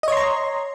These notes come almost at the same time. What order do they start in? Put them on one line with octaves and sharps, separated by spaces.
D#5 C#5 C6 A#5